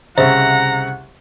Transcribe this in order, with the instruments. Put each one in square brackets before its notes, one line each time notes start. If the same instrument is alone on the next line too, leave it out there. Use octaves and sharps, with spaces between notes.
[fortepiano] C2 C#3 E5 [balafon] C5 [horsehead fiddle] F#5 [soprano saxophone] A#5